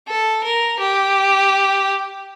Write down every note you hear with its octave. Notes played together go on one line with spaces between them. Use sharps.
A4
A#4
G4